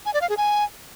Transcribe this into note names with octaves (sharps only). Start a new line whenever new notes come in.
G#5
D5
F5
G#4
G#5